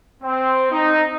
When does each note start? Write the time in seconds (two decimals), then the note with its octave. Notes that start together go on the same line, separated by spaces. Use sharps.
0.23 C4
0.71 D#4